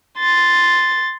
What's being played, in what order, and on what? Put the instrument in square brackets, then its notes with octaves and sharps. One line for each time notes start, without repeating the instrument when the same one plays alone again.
[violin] C6 A6